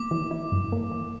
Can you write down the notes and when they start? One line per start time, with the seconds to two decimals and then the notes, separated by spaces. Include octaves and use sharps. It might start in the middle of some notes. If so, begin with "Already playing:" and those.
Already playing: A#3 D6
0.11 E3
0.31 E4
0.52 G2
0.72 A#3
0.92 E3